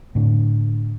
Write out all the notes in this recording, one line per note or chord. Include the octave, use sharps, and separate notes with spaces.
A2 D3